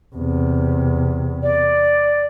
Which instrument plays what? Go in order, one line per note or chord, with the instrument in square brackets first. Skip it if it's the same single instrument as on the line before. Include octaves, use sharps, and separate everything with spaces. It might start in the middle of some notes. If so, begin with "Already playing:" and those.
[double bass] E2 C3
[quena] D5